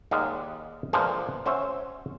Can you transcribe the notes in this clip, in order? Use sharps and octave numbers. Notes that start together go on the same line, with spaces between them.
D#2 G#3 D#4 D5 F5 F#5
A#2 D3 E3 F3 G#3
C#4 F#4 C5 C#5 E5 G#5